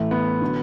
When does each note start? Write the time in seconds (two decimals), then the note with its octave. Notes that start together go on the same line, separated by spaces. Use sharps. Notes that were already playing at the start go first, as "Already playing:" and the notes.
Already playing: A1 A2 E3 A3
0.11 B3
0.42 D3 F#3